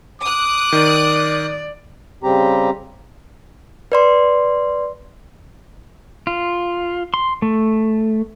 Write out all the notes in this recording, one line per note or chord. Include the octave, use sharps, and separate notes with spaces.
D6 D#6 F#6
D#3 D5
C#3 G3 C4 G4 A#5
B4 D5 C6
F4
C6
A3